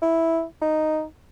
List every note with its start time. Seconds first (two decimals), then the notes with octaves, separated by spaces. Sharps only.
0.02 E4
0.61 D#4